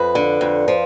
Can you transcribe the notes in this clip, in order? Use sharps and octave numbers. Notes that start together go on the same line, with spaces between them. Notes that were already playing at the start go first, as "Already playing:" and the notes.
Already playing: F2 B4
D3
F2
F3